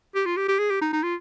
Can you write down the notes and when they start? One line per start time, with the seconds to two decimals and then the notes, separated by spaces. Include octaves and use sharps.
0.15 G4
0.26 F4
0.37 G4
0.48 G4
0.59 G#4
0.70 G4
0.81 D#4
0.93 D#4
1.03 F4